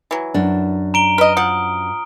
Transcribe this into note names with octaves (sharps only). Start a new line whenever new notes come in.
E3 F#3
F#2 D4
A#5 D7 G7
B4 D#5 F6
F3 F#5 D#6